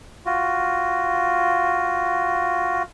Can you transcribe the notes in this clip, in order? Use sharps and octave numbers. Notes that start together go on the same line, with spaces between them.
F4 F#4